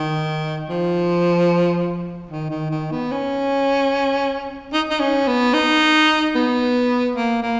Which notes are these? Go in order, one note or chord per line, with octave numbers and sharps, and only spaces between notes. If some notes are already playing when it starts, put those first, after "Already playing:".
Already playing: D#3
F3
D#3
D#3
D#3
B3
C#4
D#4
D#4
C#4
B3
D#4
B3
A#3
A#3